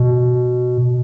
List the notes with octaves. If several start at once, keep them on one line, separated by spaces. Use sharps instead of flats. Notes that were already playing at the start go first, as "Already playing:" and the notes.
Already playing: B2